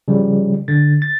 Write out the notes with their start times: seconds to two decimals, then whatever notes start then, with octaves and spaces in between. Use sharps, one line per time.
0.08 C#3 F3 G3
0.68 D3 A6
1.02 A6